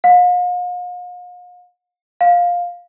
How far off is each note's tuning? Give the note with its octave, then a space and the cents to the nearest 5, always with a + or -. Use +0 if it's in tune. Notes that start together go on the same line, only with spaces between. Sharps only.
F5 +45
F5 +10